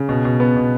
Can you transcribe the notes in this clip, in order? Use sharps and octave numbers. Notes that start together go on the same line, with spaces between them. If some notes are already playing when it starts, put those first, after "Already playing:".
Already playing: C#3
B2
B2
B3
B2